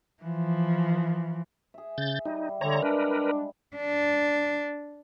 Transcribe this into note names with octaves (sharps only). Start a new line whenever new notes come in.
E3 F3
G#4 E5
C#3 G6 A6
G3 D#4 E4
D3 G3 G#3 C#5 A#5
D4 A#4 B4
D4